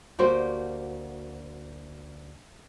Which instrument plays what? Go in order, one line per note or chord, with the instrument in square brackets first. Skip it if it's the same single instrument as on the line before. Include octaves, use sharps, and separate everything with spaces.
[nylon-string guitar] D2 A#3 F#4 [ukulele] G4 C5